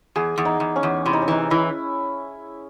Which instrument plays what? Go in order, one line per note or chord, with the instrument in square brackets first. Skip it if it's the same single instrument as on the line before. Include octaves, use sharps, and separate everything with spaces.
[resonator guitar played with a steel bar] E2 [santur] G#4
[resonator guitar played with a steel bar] E2
[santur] D#4
[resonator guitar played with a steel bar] E2
[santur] C#4
[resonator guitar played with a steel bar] E2
[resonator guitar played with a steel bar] C3 [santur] E4
[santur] D#4
C#4
[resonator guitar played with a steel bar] E3 [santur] D#4
[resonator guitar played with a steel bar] E3 [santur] E4